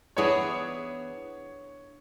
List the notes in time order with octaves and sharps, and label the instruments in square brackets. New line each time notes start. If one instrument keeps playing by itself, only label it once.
[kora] E3 B3 D4 G#4 [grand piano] C#5